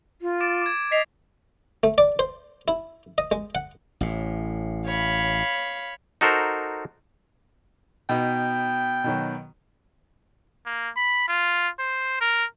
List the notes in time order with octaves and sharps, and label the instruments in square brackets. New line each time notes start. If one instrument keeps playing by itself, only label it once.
[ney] F4
[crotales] D6 A6 D7
D6 G#6
[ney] D#5 [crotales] B6 C7 F7
[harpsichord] A3
D5
C5
E4
D#5
G#3
F#5
[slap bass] A1 A2
[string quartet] C#5 F5 B5
[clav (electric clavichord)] D#4 F#4 A4 A#4 C5
[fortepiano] B2 B3 D#4 [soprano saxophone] G5
[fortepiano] B2 D#3 F#3
[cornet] A#3
B5
F4
C5
A#4